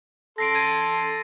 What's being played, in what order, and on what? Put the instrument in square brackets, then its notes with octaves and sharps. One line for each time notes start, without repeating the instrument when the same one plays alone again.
[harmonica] A4 C6 [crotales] A#6 C7 D7
[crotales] G#6 A6 D#7